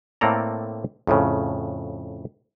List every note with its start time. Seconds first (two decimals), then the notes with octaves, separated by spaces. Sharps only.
0.21 A2 A#3 C4 A4 D5 A#5
1.07 F2 A2 C#3